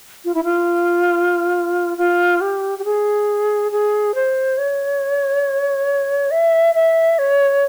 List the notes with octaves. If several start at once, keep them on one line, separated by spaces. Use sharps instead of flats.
F4
E4
F4
F4
G4
G4
G#4
G#4
C5
C#5
E5
E5
C#5